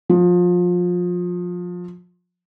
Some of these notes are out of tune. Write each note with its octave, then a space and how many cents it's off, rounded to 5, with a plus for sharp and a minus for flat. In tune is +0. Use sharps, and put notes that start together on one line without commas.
F3 +25